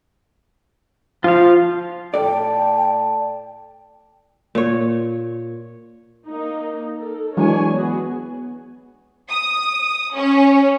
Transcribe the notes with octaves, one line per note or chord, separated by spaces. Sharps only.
F3 F4 F5
A2 A4 D5 G5 A5
A#2 C#5
A#3 D#4
A4 A#4
E3 F#3 G#3 D4 C#5 G#5
B3 F#4 G#4
D#6
C#4